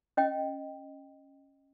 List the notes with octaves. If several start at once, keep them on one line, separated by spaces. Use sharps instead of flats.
C#4 D#5 G5